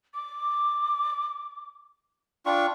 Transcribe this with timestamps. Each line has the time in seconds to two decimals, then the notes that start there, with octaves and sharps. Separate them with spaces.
0.14 D6
2.46 D4 F4 G5 C#6